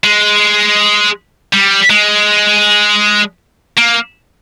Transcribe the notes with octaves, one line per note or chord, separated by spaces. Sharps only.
G#3
G3
G#3
A#3